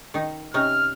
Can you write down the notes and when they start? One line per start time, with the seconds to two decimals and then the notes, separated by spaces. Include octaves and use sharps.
0.14 D#3 D#4
0.54 C3 C#4 D#4 F6